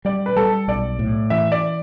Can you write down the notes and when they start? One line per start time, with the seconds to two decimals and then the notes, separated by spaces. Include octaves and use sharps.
0.05 G3 D5
0.26 B4
0.36 G3 A4
0.68 B1 D5
0.99 A2
1.30 E3 E5
1.52 D5